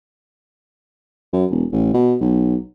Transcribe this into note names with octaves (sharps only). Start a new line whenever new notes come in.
F#2
E1
A1
B2
B1